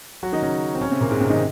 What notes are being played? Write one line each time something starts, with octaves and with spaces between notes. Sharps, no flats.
F#3 F#4
D#3 D#4
C#3 C#4
C4
C#3 C#4
C3 C4
A#2 A#3
G#2 G#3
C3 C4
D#3 D#4